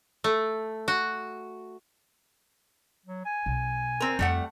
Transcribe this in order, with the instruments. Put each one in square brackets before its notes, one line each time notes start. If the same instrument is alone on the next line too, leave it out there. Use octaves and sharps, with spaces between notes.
[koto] A3
F#4
[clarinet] F#3
G#5
[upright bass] B1
[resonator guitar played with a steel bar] C4 A#4
[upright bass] F2 F4 [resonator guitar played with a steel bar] G3 A3 F#5